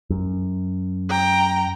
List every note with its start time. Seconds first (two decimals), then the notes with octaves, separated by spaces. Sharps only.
0.10 F#2
1.09 G5 A#5